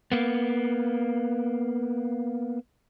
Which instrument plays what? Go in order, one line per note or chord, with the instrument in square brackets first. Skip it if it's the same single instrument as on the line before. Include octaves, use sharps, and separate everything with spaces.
[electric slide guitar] A#3 B3